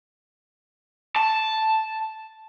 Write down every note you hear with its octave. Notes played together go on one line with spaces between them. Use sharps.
A5